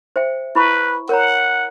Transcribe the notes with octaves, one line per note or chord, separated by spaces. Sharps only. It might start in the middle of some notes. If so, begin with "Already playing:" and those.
C5 E5 G5
E4 B4 B5 C#6
A#4 C#5 F#5 A#5